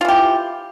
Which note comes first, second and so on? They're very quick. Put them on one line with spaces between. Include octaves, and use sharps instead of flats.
F4 E3 G4